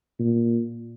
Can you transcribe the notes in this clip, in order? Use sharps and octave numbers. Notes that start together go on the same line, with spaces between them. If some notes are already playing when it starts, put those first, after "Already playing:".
A#2